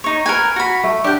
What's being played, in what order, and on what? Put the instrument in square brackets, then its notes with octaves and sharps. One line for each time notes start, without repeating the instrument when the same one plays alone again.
[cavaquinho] D#4 C#5
A#4 B4 G#5
F#4 B5
[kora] A3
[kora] D4 F#5 [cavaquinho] G4 G5